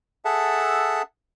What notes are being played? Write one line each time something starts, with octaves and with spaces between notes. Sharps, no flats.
G#4 A4 E5 F#5 A5